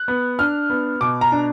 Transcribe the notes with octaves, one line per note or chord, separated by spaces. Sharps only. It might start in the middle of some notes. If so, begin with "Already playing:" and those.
Already playing: F#6
B3
D4 F6
B3
B2 D6
A#5
D4